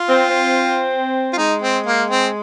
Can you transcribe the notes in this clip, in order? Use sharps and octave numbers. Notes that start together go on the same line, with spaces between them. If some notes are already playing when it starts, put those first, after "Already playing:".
Already playing: F4
C4
C4
F4
G#3 D#4
C4
A#3
C4